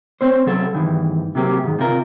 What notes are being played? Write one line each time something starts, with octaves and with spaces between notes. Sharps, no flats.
C4 C#4 C5
C2 F#3 A4
G2 D#3 E3
C3 F#3 A#3 G4
G#2 D#3
C3 F4 A#4